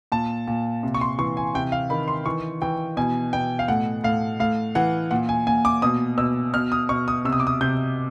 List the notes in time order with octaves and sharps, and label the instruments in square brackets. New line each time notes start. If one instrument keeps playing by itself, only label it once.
[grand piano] A#2 A5
A#2
C3
C#6
C6
E3 C#6
G#5
C3 G5
F5
D#3 B5
C6
E3 C#6
E3 G5
B2 G#5
B2 G5
F5
A2 F#5
A2 F5
A2 F5
E3 F#5
A#2 F#5
G#5
A#2 G#5
D6
B2 D#6
B2 E6
B2 F6
D#6
B2 C#6
D#6
C3 E6
D#6
D6
D#6
C3 G6